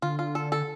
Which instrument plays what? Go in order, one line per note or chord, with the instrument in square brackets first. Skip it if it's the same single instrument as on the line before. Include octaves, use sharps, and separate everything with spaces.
[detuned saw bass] D3 [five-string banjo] F4
[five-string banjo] F4
A4
A4